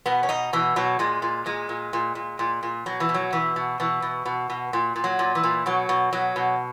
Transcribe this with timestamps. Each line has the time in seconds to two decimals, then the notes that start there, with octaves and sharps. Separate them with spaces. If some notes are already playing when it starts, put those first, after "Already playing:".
0.06 B2 B3
0.23 C#4
0.29 B2 D#4
0.53 B2 E3
0.76 B2 F#3
0.99 A#2 G#3
1.22 A#2
1.46 A#2 G#3
1.69 A#2
1.93 A#2
2.15 A#2
2.39 A#2
2.63 A#2
2.86 B2 F#3
3.00 E3
3.09 B2
3.14 F#3
3.32 B2 E3
3.56 B2
3.80 B2 E3
4.02 B2
4.26 B2
4.50 B2
4.73 A#2
4.96 A#2
5.04 F#3
5.19 A#2
5.35 E3
5.43 A#2
5.66 B2 F#3
5.89 B2
6.13 B2 F#3
6.36 B2